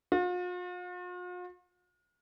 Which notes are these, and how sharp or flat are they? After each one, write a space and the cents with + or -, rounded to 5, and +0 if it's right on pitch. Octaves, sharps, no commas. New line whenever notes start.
F4 +45